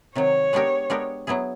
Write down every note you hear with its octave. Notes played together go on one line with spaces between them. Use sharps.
C3 D#3 F#3 C#5
G#3 B3 D4 G4 A#4
G#3 B3 D4 G4 A#4
F#3 B3 E4 G#4